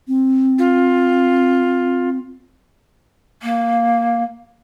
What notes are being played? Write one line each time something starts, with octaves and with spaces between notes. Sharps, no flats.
C4
F4
A#3